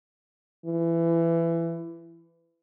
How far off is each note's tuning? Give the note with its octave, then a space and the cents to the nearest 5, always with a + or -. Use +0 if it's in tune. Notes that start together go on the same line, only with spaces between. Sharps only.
E3 +20